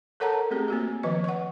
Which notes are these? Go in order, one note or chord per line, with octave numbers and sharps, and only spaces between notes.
A4 A#4 C#5 F#5 A5 A#5
A3 C4 G4 G#4
A#3 F#4 G4
D#3 F3 B4 D#5
F#5 C#6